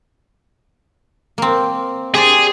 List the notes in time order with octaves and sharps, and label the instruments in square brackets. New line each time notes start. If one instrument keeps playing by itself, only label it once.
[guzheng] A#3 C4
[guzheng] G4 C5 D5 [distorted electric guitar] G#4